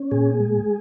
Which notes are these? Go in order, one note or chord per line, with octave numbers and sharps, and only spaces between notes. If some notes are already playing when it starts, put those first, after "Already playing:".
Already playing: C#4
A#2 G#4
G#3